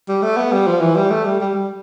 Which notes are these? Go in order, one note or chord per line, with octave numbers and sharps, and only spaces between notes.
G3
A3
B3
G3
F3
E3
G3
A3
G3
G3
G3